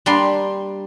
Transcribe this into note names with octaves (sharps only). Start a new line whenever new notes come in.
G3 A#3 D4 D5 C6